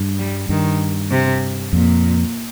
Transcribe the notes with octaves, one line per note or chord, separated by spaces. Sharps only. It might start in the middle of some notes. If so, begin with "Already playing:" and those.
Already playing: G2
G3
G2 D#3
C3
F2 A#2